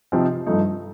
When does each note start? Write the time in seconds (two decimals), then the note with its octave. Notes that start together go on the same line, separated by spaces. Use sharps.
0.12 C3 F3 C4 D#4 G4
0.46 G2 F3 A3 D#4